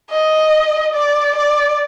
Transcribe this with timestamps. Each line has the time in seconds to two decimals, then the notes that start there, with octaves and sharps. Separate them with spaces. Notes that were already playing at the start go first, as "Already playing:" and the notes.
0.10 D#5
0.94 D5
1.36 D5